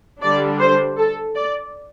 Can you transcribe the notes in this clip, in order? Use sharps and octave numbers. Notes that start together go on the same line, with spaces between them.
D3 G3 D4 D5
C5
A4
D5